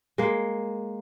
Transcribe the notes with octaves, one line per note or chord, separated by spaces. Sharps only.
G#3 A#3